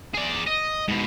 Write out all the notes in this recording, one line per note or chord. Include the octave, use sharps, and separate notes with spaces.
G#4 D5
D#5
G#2 B2